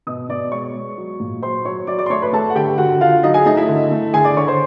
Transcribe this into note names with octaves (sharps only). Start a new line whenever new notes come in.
B2 D#5 D#6
B2 D5 D6
G#3 C#5 C#6
G#3
F#3
A#2
F#3 C5 C6
F#3 C#5 C#6
F#3 D5 D6
D5 D6
C6
A3 C#5 C#6
B4 B5
A3 A4 A5
F#5
D3 G4 G5
D3 F#4 F#5
D3 F4 F5
F#3 D#4 D#5
G#4 G#5
A3 D#4 D#5
E4 E5
D3
A3
D3 G#4 G#5
D5 D6
D3 C#5 C#6
C5 C6